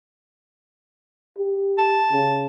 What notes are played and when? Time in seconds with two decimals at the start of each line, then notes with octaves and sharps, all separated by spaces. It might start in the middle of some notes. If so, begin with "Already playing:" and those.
1.38 G4
1.78 A5
2.12 C#3